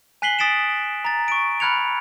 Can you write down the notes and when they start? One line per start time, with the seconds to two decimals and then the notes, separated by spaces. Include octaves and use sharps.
0.22 G#5 F#6 B6 C7 F#7 G7
0.39 G#5 D#6 A6 B6 D7 E7
1.05 A#5 A6
1.28 C#6 D7
1.60 B5 F6 F#6 G#6 C#7 F7